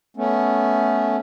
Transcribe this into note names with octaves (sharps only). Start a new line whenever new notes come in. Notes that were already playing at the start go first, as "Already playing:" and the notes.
A3 B3 C#4